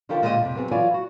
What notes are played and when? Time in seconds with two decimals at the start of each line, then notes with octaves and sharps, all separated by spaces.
0.09 D3 F3 C#4 D#4 G4 A#4
0.22 A#2 D3 G#3 C#4 G4 D#5
0.41 F2 C3
0.55 F#3 B3 C4 G#4
0.71 E3 F#3 F4 C#5 D5 G#5
0.94 F#4